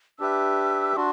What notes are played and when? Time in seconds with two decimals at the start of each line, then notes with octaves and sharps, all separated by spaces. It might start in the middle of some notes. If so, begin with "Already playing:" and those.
0.19 D4 G4 B4 E5 E6
0.96 D4 F#4 C6